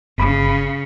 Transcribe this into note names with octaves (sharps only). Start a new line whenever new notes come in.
G1 C#3 B5